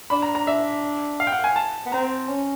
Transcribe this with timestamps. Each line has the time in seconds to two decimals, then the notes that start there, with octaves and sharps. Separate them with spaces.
0.10 D4 B5
0.22 A#5
0.35 A#5
0.47 D4 E5
1.20 F5
1.27 G5
1.32 F#5
1.44 G#5
1.56 A5
1.86 B3
1.92 C4 A#5
2.29 C#4